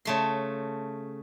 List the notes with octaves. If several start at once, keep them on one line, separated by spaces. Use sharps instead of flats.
C#3 A3 C6